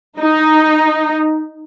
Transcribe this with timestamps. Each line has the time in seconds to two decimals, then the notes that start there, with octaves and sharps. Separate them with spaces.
0.20 D#4